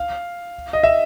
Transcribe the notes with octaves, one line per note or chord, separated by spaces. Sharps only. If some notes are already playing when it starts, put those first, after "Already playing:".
Already playing: F5
D#5
E5